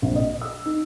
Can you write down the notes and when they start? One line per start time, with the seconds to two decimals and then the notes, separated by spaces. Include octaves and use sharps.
0.02 A#1
0.16 D#5
0.41 E6
0.66 D#4